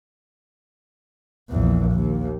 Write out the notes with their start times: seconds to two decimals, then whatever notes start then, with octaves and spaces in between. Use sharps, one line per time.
1.50 A#1 E2
1.91 D#2